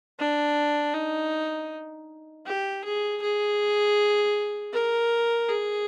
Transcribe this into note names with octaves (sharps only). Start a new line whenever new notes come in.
D4
D#4
G4
G#4
G#4
A#4
G#4